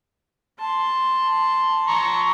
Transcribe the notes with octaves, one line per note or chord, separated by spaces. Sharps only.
A5 C6
A#5 C#6